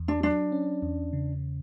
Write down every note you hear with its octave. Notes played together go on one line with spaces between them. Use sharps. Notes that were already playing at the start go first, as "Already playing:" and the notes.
Already playing: E2
D4
F#3 D4
C#4
E2
C#3